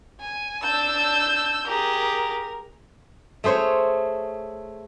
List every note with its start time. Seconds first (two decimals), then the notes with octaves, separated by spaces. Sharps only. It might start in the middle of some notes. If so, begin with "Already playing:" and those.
0.20 G#5
0.63 D4 A5 E6 G6
1.68 G4 G#4 A#4
3.44 A3 G#4 C5 C#5